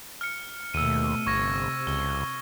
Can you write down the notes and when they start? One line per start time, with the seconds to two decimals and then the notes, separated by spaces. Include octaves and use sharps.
0.21 F6 C#7
0.74 D#2 B2 A3 E6 D#7
1.27 G1 C3 C#6 G#6 A#6
1.87 C#2 G7